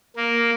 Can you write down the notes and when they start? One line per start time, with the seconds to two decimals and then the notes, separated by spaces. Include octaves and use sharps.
0.16 A#3